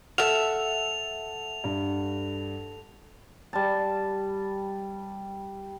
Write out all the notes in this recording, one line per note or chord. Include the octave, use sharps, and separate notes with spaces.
A4 E5 F#5 F6 F7
G2
G3 A5